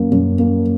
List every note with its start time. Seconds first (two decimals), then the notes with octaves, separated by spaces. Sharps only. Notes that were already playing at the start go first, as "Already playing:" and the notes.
Already playing: F#2 A#3 C#4
0.12 F#2
0.39 A#3